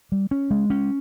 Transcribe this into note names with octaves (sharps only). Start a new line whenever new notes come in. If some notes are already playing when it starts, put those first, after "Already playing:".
G3
C#4
G#3
C#4